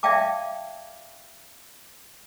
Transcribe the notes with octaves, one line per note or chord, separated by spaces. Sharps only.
D5 E5 F5 G5 A5 D6